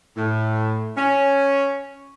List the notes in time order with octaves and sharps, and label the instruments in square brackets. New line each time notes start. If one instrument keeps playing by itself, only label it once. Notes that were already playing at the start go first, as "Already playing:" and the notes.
[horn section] A2
C#4